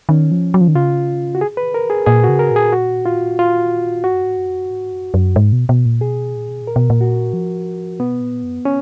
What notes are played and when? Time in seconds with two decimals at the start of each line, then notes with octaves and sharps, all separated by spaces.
0.09 D#3 C#4
0.31 F3
0.54 F#3
0.61 F3
0.68 D#3
0.75 C#3 F4
1.35 F#4
1.41 G#4
1.57 B4
1.74 A#4
1.90 G#4
2.06 A#2 G#4
2.24 F#4
2.28 C#3
2.39 A#4
2.51 A#2
2.56 G#4
2.72 F#4
3.06 F4
3.39 F4
4.04 G#2 F#4
4.14 F#2
4.24 G#2
4.37 F#2
4.48 F2
4.59 F#2
4.70 G#2
4.92 F#2
5.14 F#2
5.36 G#2
5.52 B2
5.69 B2
5.86 A#2
6.01 B2 G#4
6.35 A#2
6.49 B2
6.62 A#2
6.67 A#4
6.76 B2
6.90 A#2
7.01 F#4
7.33 F3
8.00 B2 B3
8.21 A#2
8.43 F#2
8.65 C#4